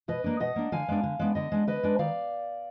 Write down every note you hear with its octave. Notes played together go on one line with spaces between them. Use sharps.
B2 B4 D#5
A#3 D4
B2 D#5 F#5
A#3 D4
D3 F5 G#5
G#3 B3 D4
D3
G#3 B3 D4
D3 D#5 F#5
G#3 D4
D3 B4 D#5
G#3 D4
D#3 D5 F5